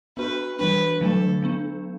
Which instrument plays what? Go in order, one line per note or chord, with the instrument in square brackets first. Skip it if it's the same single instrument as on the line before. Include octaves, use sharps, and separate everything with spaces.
[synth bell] B3 D4 F#4 [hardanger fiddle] B4
[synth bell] E3 G3 D4 [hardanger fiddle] B4
[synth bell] D3 F#3 A3 D4 [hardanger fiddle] A4
[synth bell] F#3 B3 D4